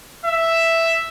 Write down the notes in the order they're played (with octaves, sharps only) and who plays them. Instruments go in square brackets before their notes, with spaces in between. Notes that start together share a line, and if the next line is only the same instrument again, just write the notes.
[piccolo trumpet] E5